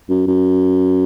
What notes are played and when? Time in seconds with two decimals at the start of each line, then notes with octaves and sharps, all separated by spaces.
0.09 F#2
0.27 F#2